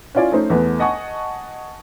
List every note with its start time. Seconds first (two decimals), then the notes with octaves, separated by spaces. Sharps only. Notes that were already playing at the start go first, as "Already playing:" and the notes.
0.15 C#4 E4 F4 D5 G#5
0.32 A3 C#4 D#4 C5
0.50 E2 A3 B3
0.79 D#5 F#5 G#5 A5 C#6